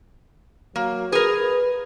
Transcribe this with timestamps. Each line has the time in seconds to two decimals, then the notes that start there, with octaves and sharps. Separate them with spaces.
0.76 F#3 A#3
1.12 G#4 A#4 B4